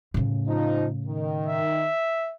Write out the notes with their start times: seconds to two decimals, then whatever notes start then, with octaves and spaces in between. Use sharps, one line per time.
0.14 A2 C#3
0.48 F3 D#4
1.07 D#3
1.47 E5